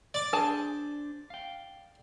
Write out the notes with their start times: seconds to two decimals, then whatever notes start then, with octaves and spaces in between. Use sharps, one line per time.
0.14 D5 D6
0.33 D4 G#4 C5 G#5 A5
1.30 F5 G5